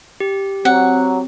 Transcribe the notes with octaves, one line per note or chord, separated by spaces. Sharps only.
G4
F#3 C4 F#5